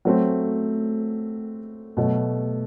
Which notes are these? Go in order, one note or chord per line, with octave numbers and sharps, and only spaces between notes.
F#3 A3 C4
B2 F#3 A3